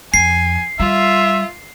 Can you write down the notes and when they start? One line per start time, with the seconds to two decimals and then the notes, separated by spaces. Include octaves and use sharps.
0.14 F2 G#5 C7
0.80 G3 F4 E5